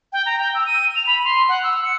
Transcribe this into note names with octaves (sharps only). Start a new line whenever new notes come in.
G5
A#5
G5
E6
D#7
F7
B5
C6
F#5
E6
C#7